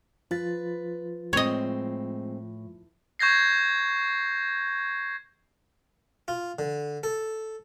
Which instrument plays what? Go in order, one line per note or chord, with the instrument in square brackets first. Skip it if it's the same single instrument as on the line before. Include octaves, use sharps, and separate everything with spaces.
[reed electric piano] F3 F4 A6 [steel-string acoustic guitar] B4
[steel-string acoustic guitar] A2 [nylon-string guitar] G#3 C4 [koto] C#5 D#5
[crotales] C#6 G6 G#6 A#6 C7
[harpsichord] F4
D3
A4